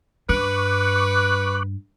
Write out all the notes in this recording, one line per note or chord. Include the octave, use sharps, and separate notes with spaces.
G2 B4 C#6 D6 F#6